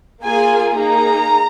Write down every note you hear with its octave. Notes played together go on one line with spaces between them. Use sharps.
A#3 F4 G#4 G#5
A#3 D#4 G#4 A#5